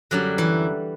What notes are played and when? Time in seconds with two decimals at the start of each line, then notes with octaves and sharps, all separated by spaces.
0.11 F#2 D3 F#3 G3 F#4
0.38 E3 E4